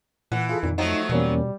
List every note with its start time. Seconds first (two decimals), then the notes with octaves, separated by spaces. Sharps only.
0.32 A#2 E3 F#5
0.49 F4 G#4 A4
0.63 F2 A#2 D#3
0.78 F3 F#3 A3 D#4
1.10 E2 B2 G3 A#3 C#4